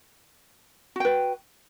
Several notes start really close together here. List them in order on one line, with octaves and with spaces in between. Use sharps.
F#4 G5 B4